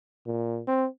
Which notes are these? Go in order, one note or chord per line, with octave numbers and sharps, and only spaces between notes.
A#2
C4